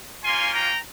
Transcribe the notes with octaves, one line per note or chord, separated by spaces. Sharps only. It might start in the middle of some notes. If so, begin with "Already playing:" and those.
A#3 C#4 F4 G#5 C6
G5 A#5